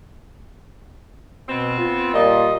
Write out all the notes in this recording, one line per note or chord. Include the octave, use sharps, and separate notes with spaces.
B2 B3 C4
F4
A#2 G3 D#5